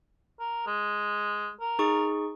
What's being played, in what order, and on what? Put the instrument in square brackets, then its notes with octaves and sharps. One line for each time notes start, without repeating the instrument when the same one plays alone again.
[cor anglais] A#4
G#3
A#4
[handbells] D#4 G#4 C#6